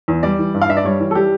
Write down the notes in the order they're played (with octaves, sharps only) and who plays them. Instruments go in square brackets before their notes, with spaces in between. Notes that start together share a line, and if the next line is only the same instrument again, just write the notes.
[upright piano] E2
G3 D5
E3
G2
F5
G2 E5
D5
G3 C#5
E3
A4
G3 G4